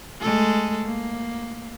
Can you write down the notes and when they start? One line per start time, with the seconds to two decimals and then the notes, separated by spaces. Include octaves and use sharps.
0.20 G#3 A3 A4
0.86 A#3